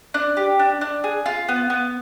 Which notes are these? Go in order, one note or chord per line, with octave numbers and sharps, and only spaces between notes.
D4
G4
D4
D4
G#4
F4
B3
B3